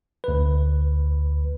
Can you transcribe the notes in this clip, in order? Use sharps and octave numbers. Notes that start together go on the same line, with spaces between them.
D2 B4